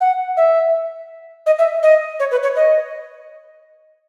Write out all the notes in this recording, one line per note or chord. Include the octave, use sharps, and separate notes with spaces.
F#5
E5
D#5
E5
D#5
C#5
B4
C#5
D#5